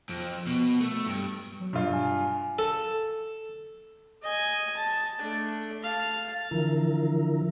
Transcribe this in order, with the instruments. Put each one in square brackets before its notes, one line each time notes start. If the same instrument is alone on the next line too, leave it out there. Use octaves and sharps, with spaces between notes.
[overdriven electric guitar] F2
B2
A3
G2
[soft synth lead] F#3
[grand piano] G2 F4 [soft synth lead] B2
[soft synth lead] G#5
[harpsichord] A4
[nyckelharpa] D#5 G#5
A5
A3 D4
F5 A5
[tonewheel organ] D3 E3 F3 E4 A#4